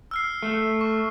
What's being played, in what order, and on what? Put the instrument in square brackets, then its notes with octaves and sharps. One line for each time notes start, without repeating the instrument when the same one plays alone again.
[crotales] E6 F6 C7
[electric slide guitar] A3
[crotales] C#6